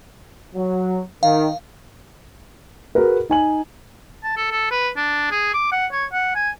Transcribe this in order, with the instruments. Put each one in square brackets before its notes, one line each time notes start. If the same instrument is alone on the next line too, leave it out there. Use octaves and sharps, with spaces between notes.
[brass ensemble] F#3
[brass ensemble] D#3 [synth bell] F5
[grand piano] F#4 G#4 A#4 B4
D#4 G#5 F#7
[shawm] A5
A4
A4
B4
D4
G#4
D6
F#5
C#5
F#5
G#5